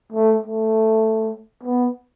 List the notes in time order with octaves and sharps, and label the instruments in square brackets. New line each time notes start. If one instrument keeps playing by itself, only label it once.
[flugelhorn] A3
A3
B3